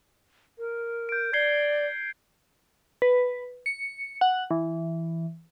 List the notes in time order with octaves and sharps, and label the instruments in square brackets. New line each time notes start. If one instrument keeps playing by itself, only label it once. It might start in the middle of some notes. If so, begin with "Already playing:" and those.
[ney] A#4
[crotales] G6 D7
[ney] D5 [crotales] G#6 C7 G7
[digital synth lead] B4
C#7
F#5
E3